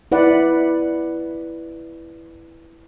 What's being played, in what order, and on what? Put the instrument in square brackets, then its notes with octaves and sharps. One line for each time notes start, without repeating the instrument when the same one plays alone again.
[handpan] E4 B4 D5 F#5